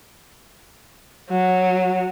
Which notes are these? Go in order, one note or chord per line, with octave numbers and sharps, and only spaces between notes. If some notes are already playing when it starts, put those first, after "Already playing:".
F#3